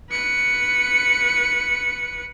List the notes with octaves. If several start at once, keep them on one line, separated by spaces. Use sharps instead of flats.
B4 C#7